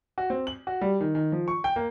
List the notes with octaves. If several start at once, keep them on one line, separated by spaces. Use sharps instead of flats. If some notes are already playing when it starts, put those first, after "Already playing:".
F#4
C4
F#7
F#4
G3
D#3
D#3
F3
C#6
G5
A#3